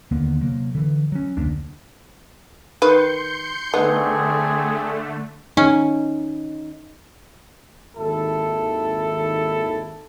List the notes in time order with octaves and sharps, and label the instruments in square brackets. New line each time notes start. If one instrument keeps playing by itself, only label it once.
[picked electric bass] D#2 D3 A#3 B3
C3 F#3 A#3
D3 E3
F#3 C#4
F1 D2 A#3 D4
[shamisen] D#3 B4 [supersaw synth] C6 G6 C#7
[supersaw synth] D3 A3 [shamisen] B3 D#4 [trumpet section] C4 D4 G#4
[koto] C#4 [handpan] D#4
[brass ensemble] G#1 D#2 E4 A4